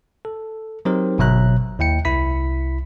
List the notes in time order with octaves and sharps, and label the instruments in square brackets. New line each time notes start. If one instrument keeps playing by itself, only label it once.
[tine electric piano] A4
F#3 C4 D#4 G4 A#4 C5
G1 B2 F#3 E5 A#5 F#6
D#2 E4 G5 C#7
C2 E4 B5 B6